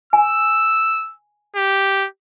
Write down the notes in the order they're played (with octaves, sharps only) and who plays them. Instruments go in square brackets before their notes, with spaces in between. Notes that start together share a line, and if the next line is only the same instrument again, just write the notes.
[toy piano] G#5 [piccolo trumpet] E6
[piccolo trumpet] G4